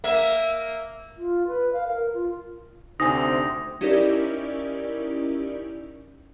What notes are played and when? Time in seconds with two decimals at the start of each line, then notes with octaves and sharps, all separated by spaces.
0.04 A#3 E5
1.17 F4
1.48 B4
1.73 F5
1.88 A#4
2.14 F4
3.00 D2 C3 C4 D#4 G#5 D#6 A#6
3.81 C#4 D#4 E4 G4 A#4 D5